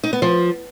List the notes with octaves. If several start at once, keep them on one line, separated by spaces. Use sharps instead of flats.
D#4
B3
F3